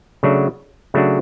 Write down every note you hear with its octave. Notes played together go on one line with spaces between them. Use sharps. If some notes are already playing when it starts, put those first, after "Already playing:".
C#3 F#3 A3 D4 F#4
C#3 F#3 A3 D4 F#4